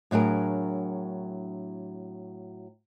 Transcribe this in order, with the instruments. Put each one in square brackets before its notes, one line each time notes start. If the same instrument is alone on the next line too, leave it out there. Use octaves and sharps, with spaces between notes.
[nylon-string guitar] A2 F#3 D4 G#4 A#4